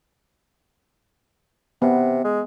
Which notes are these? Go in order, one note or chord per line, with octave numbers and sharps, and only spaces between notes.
C3 B3
G#3